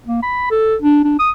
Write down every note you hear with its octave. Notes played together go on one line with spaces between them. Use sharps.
A#3
B5
A4
D4
D4
D#6